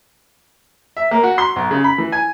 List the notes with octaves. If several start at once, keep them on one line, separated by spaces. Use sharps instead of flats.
E5
A#3
F#4
C6
B1
C#3
B5
E3
G#5